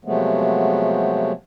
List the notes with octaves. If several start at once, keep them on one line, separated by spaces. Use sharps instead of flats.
C3 F3 F#3 G#3 A3 B3